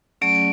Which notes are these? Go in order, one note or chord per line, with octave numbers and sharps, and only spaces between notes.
F#3 A3 C#4 G#4 D5 D7
D7